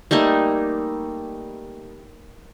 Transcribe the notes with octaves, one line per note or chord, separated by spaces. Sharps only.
G3 A3 A#3 D#4